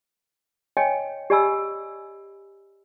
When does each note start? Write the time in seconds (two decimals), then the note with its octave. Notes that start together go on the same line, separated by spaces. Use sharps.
0.77 C#5 D#5 G5 G#5
1.30 G4 D5 D#5 G#5 B5 E6